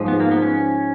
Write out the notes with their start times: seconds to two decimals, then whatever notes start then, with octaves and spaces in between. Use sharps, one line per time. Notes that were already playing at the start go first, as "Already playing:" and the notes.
Already playing: G#2 F3 G#3
0.08 B3
0.20 A#3
0.31 B3
0.42 C#4